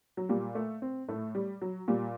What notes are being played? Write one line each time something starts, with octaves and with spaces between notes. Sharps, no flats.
F#3
A#2 G3
A3
C4
A2 A3
G3
F#3
A#2 G3